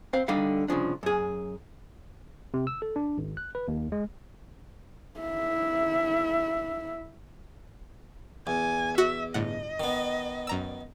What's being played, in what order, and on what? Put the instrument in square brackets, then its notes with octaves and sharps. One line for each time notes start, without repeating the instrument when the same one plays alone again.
[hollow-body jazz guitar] C4 C5 F5
D3 G3 D#4 F5
C2 C#3 F3 D4
F#2 G#4
[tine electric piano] C3
E6
A4
D4
G#1
F#6
B4
D#2
G#3
[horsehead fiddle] E4 E5
[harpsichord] E2 [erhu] G#5
[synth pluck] F#4 [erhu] E5
[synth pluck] G1 A2 F#5 [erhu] D#5
[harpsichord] D#3 B3
[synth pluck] F#2 A#5 E6